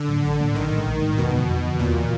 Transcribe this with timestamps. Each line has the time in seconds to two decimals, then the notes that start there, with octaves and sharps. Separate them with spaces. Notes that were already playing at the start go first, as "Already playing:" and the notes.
Already playing: D3
0.08 A2 F#3 A#3
0.24 A1 D3
0.40 A2 F#3 A#3
0.55 A#1 D#3
0.71 A2 E3 G#3
0.86 A#1
1.01 A2 E3
1.06 G#3
1.18 F2 B2
1.33 D3 F3
1.49 F2
1.64 D3 F3
1.79 E2 A#2
1.95 C#3 E3 A3